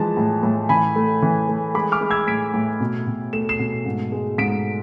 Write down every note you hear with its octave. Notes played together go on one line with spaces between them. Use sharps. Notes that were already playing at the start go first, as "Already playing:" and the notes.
Already playing: E3 F3 G#3 A5
A2
A2
E3 G#5 B5
A3
E3
A3
G#3 B5 D6
D6 F6
G#3
E6 G#6
A2 B6 D7
A2
B2
B2
A3 E7
C7 E7
B2
G#2
G#3
G#2 B6 D7